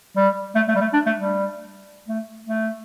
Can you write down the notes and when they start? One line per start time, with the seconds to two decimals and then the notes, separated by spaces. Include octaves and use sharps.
0.16 G3
0.55 A3
0.68 A3
0.76 G3
0.81 A3
0.93 D4
1.06 A3
1.19 G3
2.08 A3
2.47 A3